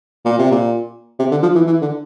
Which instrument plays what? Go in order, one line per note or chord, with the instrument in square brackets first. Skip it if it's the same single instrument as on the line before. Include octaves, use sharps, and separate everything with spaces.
[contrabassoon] A#2
C3
A#2
C3
D3
F3
E3
E3
D3